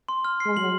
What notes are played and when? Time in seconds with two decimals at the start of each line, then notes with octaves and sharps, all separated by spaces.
0.09 C6
0.25 F6
0.40 G#3 C7
0.57 F#3 F#7